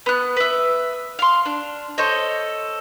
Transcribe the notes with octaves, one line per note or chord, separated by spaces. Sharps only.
B3 F#6
B4 E5
F5 C6
D4
A4 C5 C#5 D#5